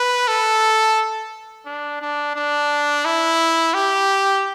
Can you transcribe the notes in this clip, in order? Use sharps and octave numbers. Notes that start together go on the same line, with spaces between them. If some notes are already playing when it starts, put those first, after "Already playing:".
Already playing: B4
A4
D4
D4
D4
E4
G4